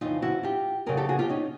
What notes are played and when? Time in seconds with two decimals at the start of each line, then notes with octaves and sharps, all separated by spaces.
0.01 F2 C#3 E3 D#4 F4
0.22 E4 F#4
0.43 F4 G4
0.86 F2 C#3 F#3 G#4 A#4
0.97 G4 A4
1.09 F#4 G#4
1.19 F4 G4
1.29 C#4 D#4